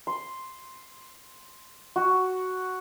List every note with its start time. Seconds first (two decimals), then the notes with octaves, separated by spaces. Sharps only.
0.07 C6
1.96 F#4